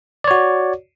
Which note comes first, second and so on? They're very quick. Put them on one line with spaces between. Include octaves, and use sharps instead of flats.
D5 C#5 F#4